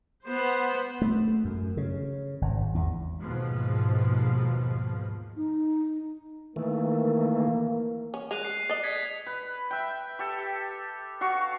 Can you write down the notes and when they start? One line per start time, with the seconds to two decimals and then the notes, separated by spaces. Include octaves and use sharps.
0.24 B3 C5
1.02 A3
1.45 F#2
1.77 C#3
2.42 G#1
2.75 E2
3.21 D#2 G#2 B2 F3
5.36 D#4
6.56 D#3 E3 A3 A#3
8.14 C#4
8.31 G#3 F#6 D#7 F7
8.43 F#6 C7 D#7
8.69 D5 D#5
8.84 G#6 B6 C#7
9.27 B4
9.71 E5 G5
10.19 G4 A4
11.21 F#4 F5 C#6